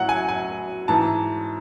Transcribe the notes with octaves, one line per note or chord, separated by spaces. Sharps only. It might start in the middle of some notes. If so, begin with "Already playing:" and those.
Already playing: A2 F#3 F#5
G#5
G#5
G#2 E3 A5